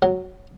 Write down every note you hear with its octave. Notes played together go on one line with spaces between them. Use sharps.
F#3